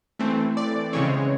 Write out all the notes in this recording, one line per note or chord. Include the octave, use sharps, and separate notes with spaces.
E3 A3 C4
D5
C#3 E3 G#3 C4 C#5